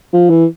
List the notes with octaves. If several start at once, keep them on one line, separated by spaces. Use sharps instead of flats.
F3
E3